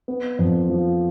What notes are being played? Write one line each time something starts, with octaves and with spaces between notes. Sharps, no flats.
B3
F2
F3